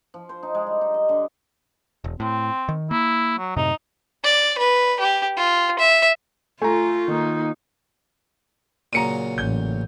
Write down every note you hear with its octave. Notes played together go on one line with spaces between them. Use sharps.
F3
C5
D#4
G#3
G3
D#4
D#5
D3
E1
A2 C4
D#3
A#3 E4
F#3
F#2 A2 C3 D#4
D5
B4
G4
F4
E5
A3 F4 G#5 A#5
D#3 A#3 D#4
A#2 C#3 F#3 A#5 C#7 D#7
A1 G6